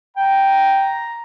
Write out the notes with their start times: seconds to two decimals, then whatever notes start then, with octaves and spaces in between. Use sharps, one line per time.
0.17 G5 A#5